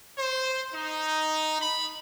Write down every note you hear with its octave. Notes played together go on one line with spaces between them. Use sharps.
C5
D#4
B5